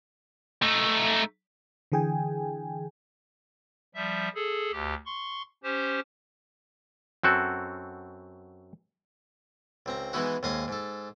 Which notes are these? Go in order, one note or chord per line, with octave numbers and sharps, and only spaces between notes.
A3 D#4
D3 E3 G#4 G5 G#5
F3 G3 E5
G#4 A4
D2 G4
C6 C#6
C#4 G4 C5
F#2 C4 F#4 A4
C#2 C4 A#5
E3 G#3 B3 D#4 E4 F#4
D#2 G#2 D#5 F5 G#5
G#2 A4